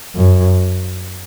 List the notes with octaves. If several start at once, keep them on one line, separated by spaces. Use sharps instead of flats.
F#2